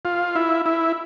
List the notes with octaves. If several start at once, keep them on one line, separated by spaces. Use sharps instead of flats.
F4
E4
E4